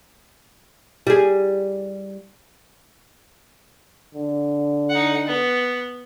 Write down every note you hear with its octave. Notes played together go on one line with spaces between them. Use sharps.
G3 G#4
D3
D#4 F#5
B3